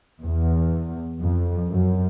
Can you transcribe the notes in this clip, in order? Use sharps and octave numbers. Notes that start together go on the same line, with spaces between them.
E2
F2
F#2